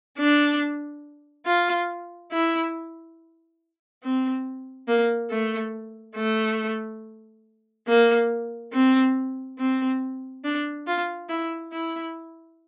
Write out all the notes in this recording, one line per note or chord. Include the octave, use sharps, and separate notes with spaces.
D4
F4
E4
C4
A#3
A3
A3
A#3
C4
C4
D4
F4
E4
E4